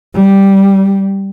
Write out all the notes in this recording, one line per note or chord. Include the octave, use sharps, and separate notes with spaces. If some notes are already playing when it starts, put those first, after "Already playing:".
G3